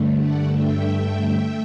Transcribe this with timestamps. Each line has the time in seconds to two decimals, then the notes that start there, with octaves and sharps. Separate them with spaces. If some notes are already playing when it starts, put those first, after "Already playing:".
Already playing: G2 D3 A3
0.17 D5 F#5
0.46 E5 G5
1.35 A3